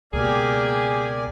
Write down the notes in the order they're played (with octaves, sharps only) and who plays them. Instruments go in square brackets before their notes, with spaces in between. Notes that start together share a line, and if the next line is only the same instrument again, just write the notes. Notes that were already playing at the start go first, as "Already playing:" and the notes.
[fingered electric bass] C#2 B2 [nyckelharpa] A#3 G4 [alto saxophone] G#4 [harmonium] A#4 D5 G#5